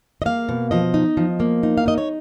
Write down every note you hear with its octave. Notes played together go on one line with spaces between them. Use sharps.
D#5
A#3 F5
B2
F3 D#5
D#4
F3
A#3
D#4
F5
D#4 D#5
C#5